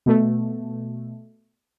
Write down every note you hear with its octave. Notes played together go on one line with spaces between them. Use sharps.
B2 A3